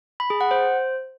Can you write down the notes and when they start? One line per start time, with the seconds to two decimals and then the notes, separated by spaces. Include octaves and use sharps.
0.20 B5
0.30 G#4
0.41 F#5
0.51 C5